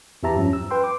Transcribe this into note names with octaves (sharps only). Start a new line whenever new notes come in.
E2 E3 G4 E5 A5 A#5
G2 F3 C#4
E6
B4 G5 C6
D6